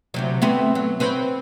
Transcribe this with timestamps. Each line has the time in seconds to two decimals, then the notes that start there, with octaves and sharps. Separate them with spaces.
0.14 D2 C3 F#3
0.42 A3 B3 C4
0.75 F#3
1.00 C4 B4 C#5